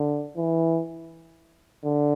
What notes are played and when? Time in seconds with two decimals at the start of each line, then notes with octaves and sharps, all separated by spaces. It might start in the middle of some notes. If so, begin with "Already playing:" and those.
Already playing: D3
0.37 E3
1.84 D3